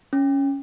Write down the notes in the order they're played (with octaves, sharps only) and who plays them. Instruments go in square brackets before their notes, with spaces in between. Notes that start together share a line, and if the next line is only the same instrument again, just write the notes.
[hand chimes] C#4